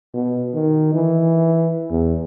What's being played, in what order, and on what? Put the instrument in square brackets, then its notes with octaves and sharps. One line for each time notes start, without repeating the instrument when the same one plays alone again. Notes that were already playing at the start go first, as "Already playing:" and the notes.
[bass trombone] B2
D#3
E3
E2